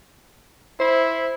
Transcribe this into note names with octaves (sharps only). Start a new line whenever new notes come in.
E4 C5